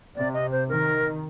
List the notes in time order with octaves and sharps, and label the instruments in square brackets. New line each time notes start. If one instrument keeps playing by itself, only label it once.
[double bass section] C3 [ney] D5
[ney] D#5
C5
[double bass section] D#3 [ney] A#4